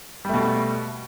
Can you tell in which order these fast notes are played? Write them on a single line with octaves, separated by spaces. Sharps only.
G3 A3 B2